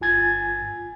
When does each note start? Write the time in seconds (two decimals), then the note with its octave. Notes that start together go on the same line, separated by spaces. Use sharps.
0.01 G1 F4 G#5 G#6 A6